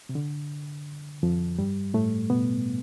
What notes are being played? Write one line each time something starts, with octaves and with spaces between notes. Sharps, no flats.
C3
D3
F2 F3
G2 G3
A2 A3
B2 B3